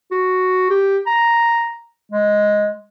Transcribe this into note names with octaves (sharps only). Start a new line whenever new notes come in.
F#4
G4
A#5
G#3